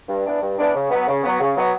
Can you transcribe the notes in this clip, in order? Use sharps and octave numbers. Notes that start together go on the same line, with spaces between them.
G2
E3 B3 D4
G2
E3 B3 D4
C#3
F#3 B3
C#3
F#3 B3
C#3
F#3 B3